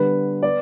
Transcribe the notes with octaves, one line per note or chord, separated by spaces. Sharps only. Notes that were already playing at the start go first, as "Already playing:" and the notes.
Already playing: D3 G3 B3 B4
B3 D5